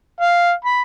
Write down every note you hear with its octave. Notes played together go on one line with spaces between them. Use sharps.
F5
B5